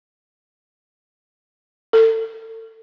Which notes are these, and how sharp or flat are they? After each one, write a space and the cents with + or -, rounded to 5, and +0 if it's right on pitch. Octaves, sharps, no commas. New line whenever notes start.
A4 +30